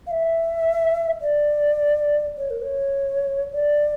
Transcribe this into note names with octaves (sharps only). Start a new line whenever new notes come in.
F5
E5
D5
C#5
A#4
C#5
D5